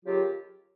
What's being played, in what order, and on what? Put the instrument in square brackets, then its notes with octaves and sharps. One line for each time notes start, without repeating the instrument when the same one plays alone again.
[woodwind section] D#2 C#3 F#3 F4 G4